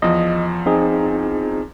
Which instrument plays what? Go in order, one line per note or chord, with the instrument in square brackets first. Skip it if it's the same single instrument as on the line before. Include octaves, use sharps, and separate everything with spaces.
[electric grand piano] E2 F3 [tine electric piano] D#5
[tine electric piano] C4 D#4 G#4